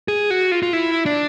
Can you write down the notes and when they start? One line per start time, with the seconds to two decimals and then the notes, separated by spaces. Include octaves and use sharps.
0.08 G#4
0.30 F#4
0.52 F4
0.63 F4
0.73 E4
1.06 D4